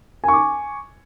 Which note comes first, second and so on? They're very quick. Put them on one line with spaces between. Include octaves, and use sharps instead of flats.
G#5 C#6 D6